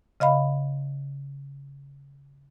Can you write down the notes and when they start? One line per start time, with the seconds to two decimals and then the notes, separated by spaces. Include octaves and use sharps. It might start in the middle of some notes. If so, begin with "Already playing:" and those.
0.20 C#3 D#5 F5 B5